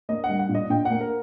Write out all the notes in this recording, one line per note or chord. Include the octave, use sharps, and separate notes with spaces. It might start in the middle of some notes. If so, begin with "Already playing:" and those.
A#3 D#5
F#5
G3
F#5
A#2
D#5
A#2 G5
A#3 F#5
A#4